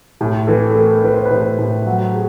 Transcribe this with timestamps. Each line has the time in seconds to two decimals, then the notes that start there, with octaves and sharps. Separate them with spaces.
0.21 A2 A4
0.47 E3 A4
0.70 A4
0.75 A3 A#4
1.04 E3 B4
1.14 C5
1.26 A2 B4
1.58 A2
1.87 F#3
2.14 G#4